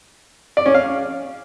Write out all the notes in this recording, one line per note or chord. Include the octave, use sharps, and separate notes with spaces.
D5
C#4
F5